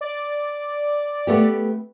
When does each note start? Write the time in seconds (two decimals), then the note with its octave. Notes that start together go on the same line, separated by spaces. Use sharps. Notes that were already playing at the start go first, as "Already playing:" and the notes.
0.01 D5
1.27 A3 B3 G4